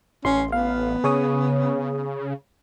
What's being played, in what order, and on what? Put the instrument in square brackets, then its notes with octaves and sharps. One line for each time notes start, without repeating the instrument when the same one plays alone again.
[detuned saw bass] A1 [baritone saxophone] C#4 [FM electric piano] C6
[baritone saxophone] B3 [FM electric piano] F5
[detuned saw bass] C#3 [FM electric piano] G#4 C#5 D#6